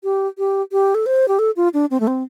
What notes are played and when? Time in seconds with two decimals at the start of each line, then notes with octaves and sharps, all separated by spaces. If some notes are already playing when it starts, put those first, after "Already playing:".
0.04 G4
0.38 G4
0.72 G4
0.95 A4
1.06 C5
1.28 G4
1.39 A4
1.57 F4
1.74 D4
1.91 C4
2.00 A3
2.07 C4